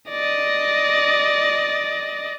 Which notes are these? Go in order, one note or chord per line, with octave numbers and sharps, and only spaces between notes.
D5 D#5